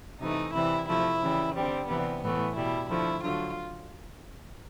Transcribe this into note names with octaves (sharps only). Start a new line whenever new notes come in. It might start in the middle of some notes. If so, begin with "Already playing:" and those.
C3 E3 A3 D#4
C3 E3 G3 E4
C3 F3 A3 E4
C#3 E3 G3
D3 G3 C4
C3 E3 G3 B3
A2 E3 A3 B3
B2 G3 E4
D3 F3 A3 E4
D3 F#3 A3 F4